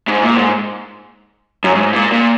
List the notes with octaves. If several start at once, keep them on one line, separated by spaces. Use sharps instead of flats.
G#2
A#2
G#2
F#2
G#2
A#2
A#2